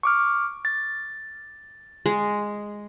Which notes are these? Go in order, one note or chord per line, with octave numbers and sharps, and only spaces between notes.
C#6 D6 F6
A6
G#3